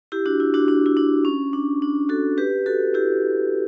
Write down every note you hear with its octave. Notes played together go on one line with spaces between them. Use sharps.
E4 G4
D4 F#4
E4
D4 F#4
D4
E4
D4
C#4
D4
D4
F#4 A4
G4 B4
F#4 A4
E4 G4